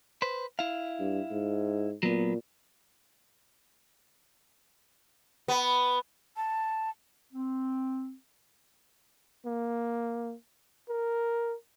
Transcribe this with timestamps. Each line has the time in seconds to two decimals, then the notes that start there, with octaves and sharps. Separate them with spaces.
0.22 B4 C5
0.59 E4 F5
1.00 G2
1.31 G#2
2.03 A#2 F#3 B3
5.48 B3
6.37 A5
7.33 C4
9.46 A#3
10.89 A#4